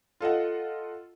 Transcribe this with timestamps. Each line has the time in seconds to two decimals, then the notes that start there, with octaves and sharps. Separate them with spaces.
0.20 F4 A4 D#5 F#5